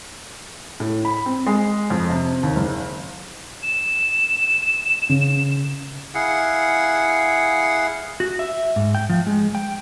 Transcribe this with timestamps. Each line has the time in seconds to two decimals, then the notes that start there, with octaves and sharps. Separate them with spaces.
0.80 A2
1.05 B5
1.26 C4
1.47 G#3
1.90 F2
2.10 C3
2.43 D#2
2.56 F#1
3.63 E7
5.09 C#3
6.14 E4 G#4 F5 F#5
8.20 F#4
8.39 E5
8.76 G#2
8.95 G5
9.09 F3
9.27 G#3
9.55 G5